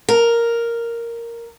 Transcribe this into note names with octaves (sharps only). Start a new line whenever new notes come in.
A#4